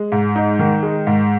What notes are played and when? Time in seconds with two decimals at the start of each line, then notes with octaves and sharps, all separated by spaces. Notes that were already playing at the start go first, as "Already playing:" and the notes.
Already playing: G#3
0.12 G#2
0.36 D#4
0.59 D#3
0.83 G#3
1.07 G#2